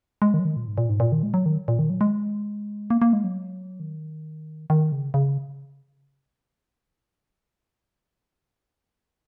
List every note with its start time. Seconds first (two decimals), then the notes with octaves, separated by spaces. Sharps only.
0.22 G#3
0.34 D#3
0.39 F#3
0.45 D#3
0.56 A#2
0.67 G#2
0.78 A#2
0.89 G#2
1.00 A#2
1.12 D#3
1.23 G#3
1.34 F#3
1.46 D#3
1.68 A#2
1.79 D#3
1.90 F#3
2.01 G#3
2.90 A#3
3.02 A#3
3.13 G#3
3.24 F#3
3.80 D#3
4.70 D#3
4.92 C#3
5.14 C#3